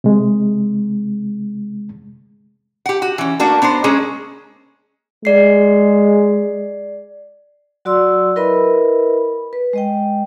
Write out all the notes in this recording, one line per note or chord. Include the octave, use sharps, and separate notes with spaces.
C3 G#3
G4 F#5
F#4
E3 C#4
A3 A#3 D4 F#4
B3 D4 A#4 C5
G#3 A#3 C#4 G#4
G#3 D5 C7
F#3 F#4 D5 C6 E6
E4 A#4 B4 D#5 E5 B5
B4
G#3 D#5 G5